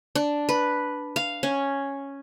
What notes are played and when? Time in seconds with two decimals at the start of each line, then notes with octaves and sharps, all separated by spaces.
0.15 D4
0.49 B4
1.16 F5
1.43 C#4